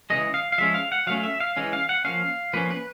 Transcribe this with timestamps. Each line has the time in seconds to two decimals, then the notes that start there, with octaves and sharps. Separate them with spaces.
0.10 C#3 E3 G#3 D#5
0.34 F5
0.52 F5
0.58 F3 G#3 C#4 E5
0.74 F5
0.92 F#5
1.07 F#3 A3 C#4 F5
1.23 E5
1.40 F5
1.57 E3 G#3 C#4
1.73 F5
1.89 F#5
2.05 F3 A#3 C#4 F5
2.53 F3 A#3 C#4 B4
2.70 B4